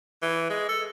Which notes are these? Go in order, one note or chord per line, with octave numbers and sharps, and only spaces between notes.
E3
G#3
A4